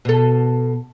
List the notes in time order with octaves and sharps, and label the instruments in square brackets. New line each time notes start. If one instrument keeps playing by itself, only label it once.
[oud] B2 A4